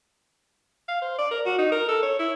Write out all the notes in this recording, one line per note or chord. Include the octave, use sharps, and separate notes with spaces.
F5
C5
D5
A#4
F#4
D#4
A#4
A4
C#5
E4